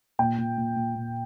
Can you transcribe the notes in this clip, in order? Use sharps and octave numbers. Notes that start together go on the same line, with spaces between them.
A#2 G5
A#2
A#2
A#2
A#2